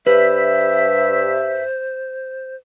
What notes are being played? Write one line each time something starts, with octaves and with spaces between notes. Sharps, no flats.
G2 B4 C5 E5